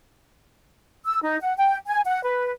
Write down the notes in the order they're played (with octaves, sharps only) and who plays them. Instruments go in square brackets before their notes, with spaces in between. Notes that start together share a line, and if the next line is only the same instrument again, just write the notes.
[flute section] E6
D#4
F#5
G5
G#5
F#5
B4